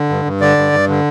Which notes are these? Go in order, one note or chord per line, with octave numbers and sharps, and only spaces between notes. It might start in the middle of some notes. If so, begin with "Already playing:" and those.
Already playing: D3
G2
G2
D3 D5
G2
G2
D3